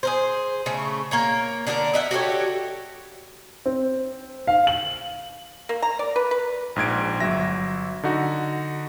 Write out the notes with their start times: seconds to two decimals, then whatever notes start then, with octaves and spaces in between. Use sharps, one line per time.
0.03 G#4 A#4 C5
0.66 C#3 A3
1.11 A#3 A#4 C#5
1.67 D3 D4 G#4 A#4
1.94 D#5 E5 F#5
2.11 F#4 G4 A4 C#5
3.66 C4
4.47 F5
4.67 F#7
5.69 A#3
5.82 A#5
5.99 D5
6.16 B4
6.31 B4
6.76 A#1 G#2 G#6 D7
7.20 G1 F#3 E5 A#6
8.03 D3 D#4 F#4